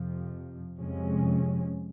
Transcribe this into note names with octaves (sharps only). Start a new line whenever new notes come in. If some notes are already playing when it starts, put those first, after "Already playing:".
Already playing: F2 C3 F3
F2 C3 F3 G#3 C#4